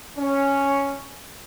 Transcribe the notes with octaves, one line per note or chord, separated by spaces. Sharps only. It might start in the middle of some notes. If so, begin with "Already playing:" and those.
C#4